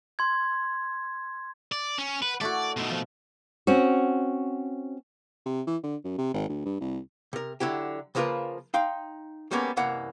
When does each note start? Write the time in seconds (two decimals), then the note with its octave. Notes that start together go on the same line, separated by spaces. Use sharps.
0.19 C6 G#6
1.72 D5
1.98 C#4
2.22 B4 F#5
2.41 A3 E4 F#4 D5
2.77 B2 A3 D#4 C6
2.89 F3
3.67 C4 C#4 F#4
5.46 C3
5.67 E3
5.83 D3
6.04 F#2
6.18 C3
6.34 G#1
6.49 D2
6.65 G2
6.81 C2
7.33 C3 A#4
7.60 D3 F#3 E4 G4
8.15 C#3 F3 A#3 F4 A#4 B4
8.74 D#4 F5 G5 C6
9.51 G3 G#3 A#3 B3 C#4
9.77 C2 F#2 E3 A#3 F#5